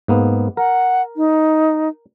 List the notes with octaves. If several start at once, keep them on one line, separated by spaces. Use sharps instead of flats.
G#2 A#3 B3
A#4 F#5
D#4